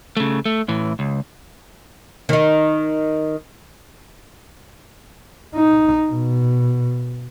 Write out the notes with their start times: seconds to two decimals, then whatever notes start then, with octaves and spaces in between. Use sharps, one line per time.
0.17 C#3 A3
0.45 A3
0.68 A2 E3
0.99 C#2
2.29 D#3 D#4
5.55 D#4
6.10 B2